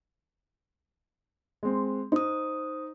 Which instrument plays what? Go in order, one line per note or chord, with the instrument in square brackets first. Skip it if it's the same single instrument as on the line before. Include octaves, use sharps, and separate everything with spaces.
[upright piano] G#3 C4
[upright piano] D#4 [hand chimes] C5 D#6